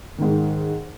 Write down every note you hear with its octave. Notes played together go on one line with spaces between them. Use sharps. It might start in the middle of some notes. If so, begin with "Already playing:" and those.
G#2 D#3